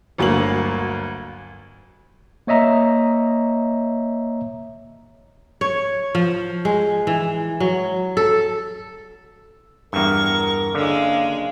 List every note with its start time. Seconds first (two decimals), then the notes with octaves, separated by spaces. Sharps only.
0.18 G1 D2 F#3 A#3 F#7
2.47 A#3 C#5 D#5 E5 A#5
5.61 C#5
6.15 F3
6.65 G#3
7.07 E3
7.60 F#3
8.17 A4
9.93 E2 G2 A#4 C#6
10.75 F#1 D3 G#3 C#5 F5